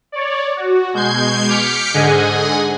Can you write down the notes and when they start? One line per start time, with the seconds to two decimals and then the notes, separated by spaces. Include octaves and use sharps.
0.12 C#5 D5
0.57 F#4
0.93 B2 G#3 G6 G#6 C7
1.48 D6 F6 G6 B6 C#7 D7
1.94 G#2 D3 G#4 D#5 F#5 G#5